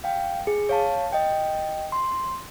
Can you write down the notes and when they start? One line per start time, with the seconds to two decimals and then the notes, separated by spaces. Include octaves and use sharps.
0.04 F5 G5
0.47 G#4
0.69 C#5 F5 A5
1.13 D#5 G5
1.92 C6